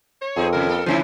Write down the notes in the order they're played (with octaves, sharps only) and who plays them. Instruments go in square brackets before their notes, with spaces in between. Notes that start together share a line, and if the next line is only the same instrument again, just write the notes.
[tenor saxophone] C#5
[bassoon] F2 [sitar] B3 D#4 G#4
[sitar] A2 C3 [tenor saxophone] A#4
[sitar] A#3 A4
[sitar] C#3 A3 D4 [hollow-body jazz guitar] F3 C#4 E4 [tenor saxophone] C5